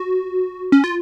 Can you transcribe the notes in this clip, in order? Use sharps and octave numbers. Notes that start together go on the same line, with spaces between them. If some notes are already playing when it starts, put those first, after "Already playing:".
Already playing: F#4
C#4
F4